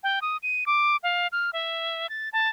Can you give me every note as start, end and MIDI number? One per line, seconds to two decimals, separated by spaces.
0.03 0.19 79
0.22 0.37 87
0.43 0.64 99
0.66 0.97 86
1.03 1.27 77
1.32 1.50 89
1.53 2.09 76
2.09 2.29 93
2.33 2.49 81